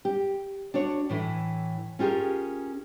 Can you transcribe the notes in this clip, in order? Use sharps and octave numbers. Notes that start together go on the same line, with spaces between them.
G4
D4 F#4 C#5
A2 E3
C#4 F4 G4 G#4 A#4